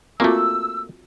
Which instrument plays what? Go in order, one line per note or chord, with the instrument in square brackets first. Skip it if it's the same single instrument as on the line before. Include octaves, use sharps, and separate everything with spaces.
[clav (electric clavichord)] A3 A#3 [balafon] C4 F4 F#4 [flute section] E6